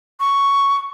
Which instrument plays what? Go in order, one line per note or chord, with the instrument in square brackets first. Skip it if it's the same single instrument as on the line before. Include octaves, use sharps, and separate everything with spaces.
[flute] C#6